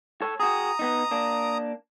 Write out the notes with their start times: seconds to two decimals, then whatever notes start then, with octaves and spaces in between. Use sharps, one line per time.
0.22 A4 C#5
0.40 F#4 G#4 A#5 D#6
0.79 B3 D#4
1.11 A#3 D4